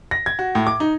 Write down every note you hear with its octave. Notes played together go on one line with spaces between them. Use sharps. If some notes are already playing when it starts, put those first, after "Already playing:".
A#6
G#6
F#4
A2
D6
D#4